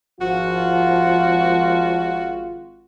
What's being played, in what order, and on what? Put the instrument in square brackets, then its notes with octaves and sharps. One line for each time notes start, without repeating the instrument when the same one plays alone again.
[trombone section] G#1 F4 [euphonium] F3 [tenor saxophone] F#4